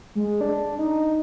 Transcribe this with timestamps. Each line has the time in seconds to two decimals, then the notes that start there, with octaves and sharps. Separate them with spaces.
0.15 G#3
0.41 D4
0.79 D#4